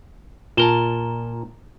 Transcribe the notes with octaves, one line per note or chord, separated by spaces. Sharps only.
A#2 F4 A#4 A5 E7 G7